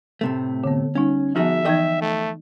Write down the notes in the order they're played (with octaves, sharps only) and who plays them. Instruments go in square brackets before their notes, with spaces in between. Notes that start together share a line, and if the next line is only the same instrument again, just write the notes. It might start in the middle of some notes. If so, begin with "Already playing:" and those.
[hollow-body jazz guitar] A2 C3 A3
[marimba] D3 B3
[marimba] G3 D#4 [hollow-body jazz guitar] C#4
[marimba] F3 B3 [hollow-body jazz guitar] D#4 F#4 G#4 [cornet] E5
[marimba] E3 D#4 G#6 [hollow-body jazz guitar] A4 D#5 G5
[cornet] A3